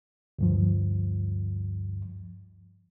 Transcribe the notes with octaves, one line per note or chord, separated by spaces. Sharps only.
D2 G2 F3